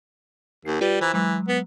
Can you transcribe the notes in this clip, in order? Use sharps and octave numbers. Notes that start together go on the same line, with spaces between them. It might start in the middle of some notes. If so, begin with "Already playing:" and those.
D#2 C7
G3 F4 G4 B4
E3 C5 A#5 B6
E3 F#3 G#3
B3